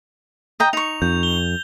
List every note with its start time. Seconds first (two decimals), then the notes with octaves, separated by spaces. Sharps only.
0.60 D#5 G5 A#5
0.73 D#4 C#6 F7
1.02 F2 G6
1.23 G7